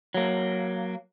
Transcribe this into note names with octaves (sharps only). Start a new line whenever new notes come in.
F#3 A#3